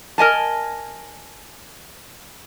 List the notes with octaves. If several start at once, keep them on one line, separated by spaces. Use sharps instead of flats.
A#4 D#5 G#5 A5